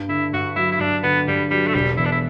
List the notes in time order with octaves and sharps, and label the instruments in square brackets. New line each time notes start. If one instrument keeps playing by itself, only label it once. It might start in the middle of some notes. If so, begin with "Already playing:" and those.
Already playing: [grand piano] G2
[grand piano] D3 [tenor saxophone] E4
[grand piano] G2 [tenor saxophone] F#4
[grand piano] F#3 [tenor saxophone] E4
[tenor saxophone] E4
[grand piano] G2 [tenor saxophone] D4
[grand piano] D3 [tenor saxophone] B3
[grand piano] G2 [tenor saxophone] G3
[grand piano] F#3 [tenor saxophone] G3
[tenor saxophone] A3
[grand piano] E1 [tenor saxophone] G3
[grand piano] E2 [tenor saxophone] E4
[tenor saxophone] D4
E4